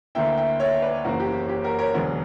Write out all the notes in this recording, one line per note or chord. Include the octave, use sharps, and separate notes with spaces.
D2 D3 A#3 E4 E5 G5
E5 G5
C#5 E5
B4 D5
F#1 E2 C#3 E3 A#3 F#4
G4
G4
F#4 A#4
A#4 C#5
E1 D2 D3 F#3 B3